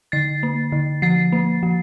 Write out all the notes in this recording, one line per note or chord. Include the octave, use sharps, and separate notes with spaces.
D3 A6 C7
A#3
D3
F3 A6 C7
A#3
F3